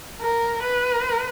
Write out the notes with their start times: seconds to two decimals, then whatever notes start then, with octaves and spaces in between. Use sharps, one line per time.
0.21 A#4
0.64 B4